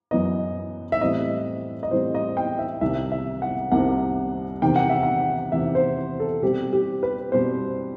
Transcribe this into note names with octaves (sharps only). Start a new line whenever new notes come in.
F#2 E3 B3 D#5
E5
A2 E3 G3 C4 D#5
D#5
A2 E3 G3 C4 C5
D#5
G5
E5
C2 C3 D#3 E5
E5
F#5
C2 C3 D#3 F#5
E2 C3 D#3 G5
F#5
E5
F#5
E2 C3 D#3 E5
C5
A4
B2 G3 C4 G4
G4
B4
B2 G3 C4 C5